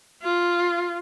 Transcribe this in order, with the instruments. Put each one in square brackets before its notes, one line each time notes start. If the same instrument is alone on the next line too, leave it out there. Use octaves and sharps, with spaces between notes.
[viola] F4